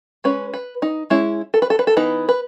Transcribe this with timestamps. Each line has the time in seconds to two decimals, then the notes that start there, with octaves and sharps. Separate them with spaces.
0.24 G#3 C#4 B4
0.54 B4
0.82 D#4
1.10 G#3 C#4 E4
1.54 A4
1.62 B4
1.70 A4
1.79 B4
1.87 A4
1.96 E3 B3 D#4 B4
2.29 B4